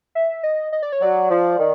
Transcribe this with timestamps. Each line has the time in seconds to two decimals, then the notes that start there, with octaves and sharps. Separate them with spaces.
0.15 E5
0.43 D#5
0.72 D#5
0.83 D5
0.92 C#5
1.01 F#3 D5
1.30 F3
1.59 D#3